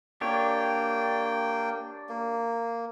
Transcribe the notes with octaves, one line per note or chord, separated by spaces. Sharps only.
A#3 D4 G4 C#5 G5
A#3